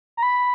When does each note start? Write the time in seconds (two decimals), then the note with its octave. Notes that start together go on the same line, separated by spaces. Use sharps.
0.17 A#5
0.23 B5